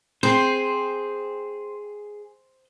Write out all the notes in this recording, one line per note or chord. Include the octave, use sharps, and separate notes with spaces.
C4 G#4 C5